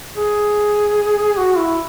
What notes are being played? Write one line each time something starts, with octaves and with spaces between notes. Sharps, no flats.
G#4
F#4
E4